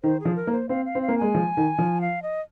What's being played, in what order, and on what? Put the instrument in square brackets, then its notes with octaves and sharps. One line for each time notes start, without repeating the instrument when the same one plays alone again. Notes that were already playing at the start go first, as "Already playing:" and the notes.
[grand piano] D#3 [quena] C5
[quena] G#4
[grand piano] F3
[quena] A#4
[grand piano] A#3
[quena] C5
[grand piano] C4 [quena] F5
[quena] F5
[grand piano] C4
[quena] F5
[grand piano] A#3
[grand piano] G#3 [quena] G#5
[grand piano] F3
D#3
F3
[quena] F5
D#5